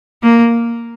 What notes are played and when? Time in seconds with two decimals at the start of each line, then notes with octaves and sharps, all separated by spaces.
0.23 A#3